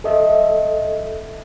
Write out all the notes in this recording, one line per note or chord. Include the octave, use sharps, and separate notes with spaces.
A4 D#5 E5